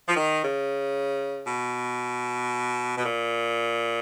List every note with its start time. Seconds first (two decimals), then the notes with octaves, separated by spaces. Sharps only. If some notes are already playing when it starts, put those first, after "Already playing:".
0.08 F3
0.16 D#3
0.42 C#3
1.47 B2
2.97 B2
3.05 A#2